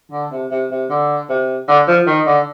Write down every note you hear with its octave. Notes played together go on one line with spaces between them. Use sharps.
D3
C3
C3
C3
D3
C3
D3
F3
D#3
D3